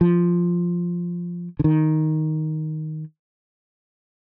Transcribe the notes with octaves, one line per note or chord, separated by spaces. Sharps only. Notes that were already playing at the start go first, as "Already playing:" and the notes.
F3
D3
D#3